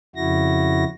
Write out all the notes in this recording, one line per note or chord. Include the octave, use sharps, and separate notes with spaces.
F2 C#3 E4 F#4 A#6